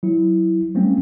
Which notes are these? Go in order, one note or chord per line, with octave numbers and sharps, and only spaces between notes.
F#3 E4
F#3 G3 A3 A#3 C4 C#4